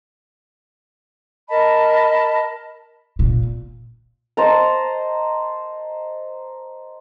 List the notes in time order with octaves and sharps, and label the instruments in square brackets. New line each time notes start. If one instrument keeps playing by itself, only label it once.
[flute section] A#4 D#5 A5 B5
[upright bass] A#2
[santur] C5 D#5 A5 A#5